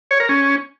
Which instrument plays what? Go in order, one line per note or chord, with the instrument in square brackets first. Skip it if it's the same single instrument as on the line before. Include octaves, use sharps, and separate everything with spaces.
[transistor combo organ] C#5
A#4
C#4